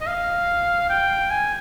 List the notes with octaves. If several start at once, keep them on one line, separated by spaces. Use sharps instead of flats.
D#5
F5
G5
G#5